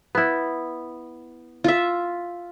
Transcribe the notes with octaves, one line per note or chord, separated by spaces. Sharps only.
B3 E4
F4 E5